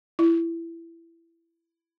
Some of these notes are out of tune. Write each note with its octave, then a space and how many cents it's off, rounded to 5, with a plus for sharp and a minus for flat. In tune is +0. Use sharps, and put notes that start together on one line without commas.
E4 +20